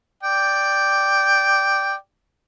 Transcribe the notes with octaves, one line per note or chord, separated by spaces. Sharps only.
D5 G5